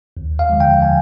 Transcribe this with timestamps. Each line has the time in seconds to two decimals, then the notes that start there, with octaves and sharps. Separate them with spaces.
0.17 D#2
0.39 F5
0.50 D3 F3 G#3
0.60 G5
0.82 G#5